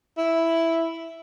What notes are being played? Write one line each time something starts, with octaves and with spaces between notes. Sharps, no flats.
E4